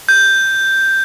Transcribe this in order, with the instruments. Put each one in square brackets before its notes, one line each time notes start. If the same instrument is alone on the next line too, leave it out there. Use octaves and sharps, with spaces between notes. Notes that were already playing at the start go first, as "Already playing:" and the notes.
[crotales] G6